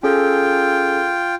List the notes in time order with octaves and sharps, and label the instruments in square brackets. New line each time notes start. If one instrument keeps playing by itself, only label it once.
[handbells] C#4 G#4 A4 [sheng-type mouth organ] F4 G5